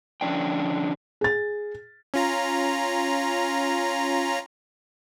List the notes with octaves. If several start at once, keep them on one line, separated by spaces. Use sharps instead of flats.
D3 F3 C#4 D4 G5
G#4 A6
C#4 F4 A#5